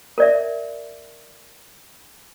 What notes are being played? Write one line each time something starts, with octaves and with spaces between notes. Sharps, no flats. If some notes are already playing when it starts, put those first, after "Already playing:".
A#4 D5 E5